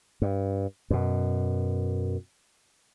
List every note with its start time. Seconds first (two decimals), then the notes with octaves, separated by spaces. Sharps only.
0.22 G2
0.90 F#2 B2